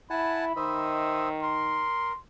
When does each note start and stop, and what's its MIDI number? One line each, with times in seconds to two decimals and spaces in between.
0.10 0.53 64
0.10 0.45 78
0.10 0.45 80
0.10 0.45 81
0.10 0.90 83
0.56 1.86 51
0.56 1.28 72
0.56 1.28 75
0.56 1.28 76
1.42 2.13 70
1.42 2.18 84